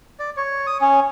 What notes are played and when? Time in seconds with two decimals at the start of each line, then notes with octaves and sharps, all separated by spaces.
0.20 D5
0.37 C#5
0.67 D#6
0.81 C#4